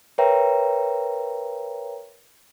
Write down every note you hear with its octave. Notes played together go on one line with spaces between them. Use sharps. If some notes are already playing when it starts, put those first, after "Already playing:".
A#4 B4 C#5 E5 G5 A#5